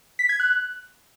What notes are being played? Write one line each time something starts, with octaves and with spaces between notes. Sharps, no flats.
B6
G#6
F#6